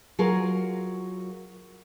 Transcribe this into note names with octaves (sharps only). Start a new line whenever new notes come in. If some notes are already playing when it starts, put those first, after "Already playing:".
F#3 F4 G#4 A#4